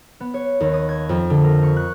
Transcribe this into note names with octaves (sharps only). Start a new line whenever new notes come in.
B3
C#5
D#2
D#6
G#6
F2
D3
A#4
C#6
F#6